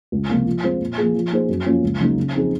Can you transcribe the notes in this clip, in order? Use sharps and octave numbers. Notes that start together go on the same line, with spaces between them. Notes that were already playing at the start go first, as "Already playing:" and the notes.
C#2
C3 F3 A#3 F4
F3
G#3 C4 F4 C5
A#2
F3 A#3 F4 G#4
F3
A#3 D#4 G#4 C5
F#2
F3 A#3 C#4 F4
C#2
C#3 F#3 A#3 D#4
C#3
F3 C4 D#4 G#4